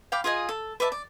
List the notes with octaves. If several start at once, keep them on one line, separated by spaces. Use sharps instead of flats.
F5 G5 B5 D6
F4 G#4 D#5 G#5
A4
B4 D5 E5 A5
D5